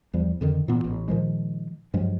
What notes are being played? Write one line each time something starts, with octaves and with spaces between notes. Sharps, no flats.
E2 F3 G3
F2 D3 D#3
A#2 E3 B3
A1
A#2 D#3 F3 G#3
G2 F3 F#3 G#3